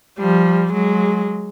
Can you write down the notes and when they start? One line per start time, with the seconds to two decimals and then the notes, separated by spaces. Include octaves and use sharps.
0.19 F3 G3
0.73 F#3 G#3